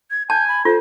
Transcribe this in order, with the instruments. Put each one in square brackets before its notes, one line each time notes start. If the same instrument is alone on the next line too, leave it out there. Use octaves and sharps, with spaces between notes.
[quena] G#6
[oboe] G#5 [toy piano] A5 [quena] G6
[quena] B5
[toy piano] F4 [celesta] A4 [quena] C5